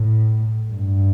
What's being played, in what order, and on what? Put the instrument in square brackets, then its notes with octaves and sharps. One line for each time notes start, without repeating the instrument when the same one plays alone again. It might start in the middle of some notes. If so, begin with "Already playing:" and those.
Already playing: [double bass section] A2
G2